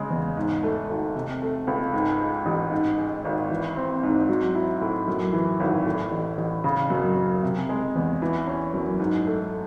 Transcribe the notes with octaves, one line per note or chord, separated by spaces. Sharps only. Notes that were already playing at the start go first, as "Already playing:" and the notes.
Already playing: C#3 G#3
E2
G#2
A3
G#1
C3
A3
C#2
G#2
G#3
A1
G#2
G#3
G#1
E3
C4
G#2
F#3
E4
A2
F#2
E3
G#1
A2
A1
A1
C#3
F#2
F#2
C3
G#3
E2
E3
C#4
F#2
G#2
A3